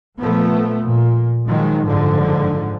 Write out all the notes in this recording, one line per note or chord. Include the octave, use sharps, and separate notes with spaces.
A#2 F3 A3 B3
A#2
D#3 F3 F#3 G#3
F#1 G#2 D3 F3